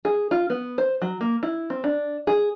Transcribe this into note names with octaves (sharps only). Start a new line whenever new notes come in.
G#4
F4
B3
C5
F#3
A#3
E4
C4
D4
G#4